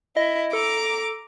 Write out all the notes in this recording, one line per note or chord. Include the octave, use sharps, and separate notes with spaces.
E4 D#5
A4 A#5 D6